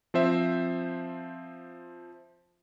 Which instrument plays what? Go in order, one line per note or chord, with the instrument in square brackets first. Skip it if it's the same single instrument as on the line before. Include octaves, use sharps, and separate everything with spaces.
[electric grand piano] F3 C4 C5 E5